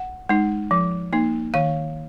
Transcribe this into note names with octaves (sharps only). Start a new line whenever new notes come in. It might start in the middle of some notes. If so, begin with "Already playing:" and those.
Already playing: F#5
G#3 D#4
F3
A#3 D#4
D#3 F5